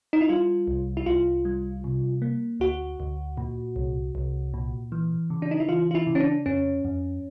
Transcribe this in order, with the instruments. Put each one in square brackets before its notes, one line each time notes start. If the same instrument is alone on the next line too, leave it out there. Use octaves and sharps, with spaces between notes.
[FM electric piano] D#4
E4
G3 F4
C2
E4
C2 F4
G3
C3
A#3
D2 F#4
D2
A#2
C2
C2
A#2
E3
C#3
D4
D#4
E4
E3 F4
F4
E4
C#3
C#4
D4
F2 C#4
F2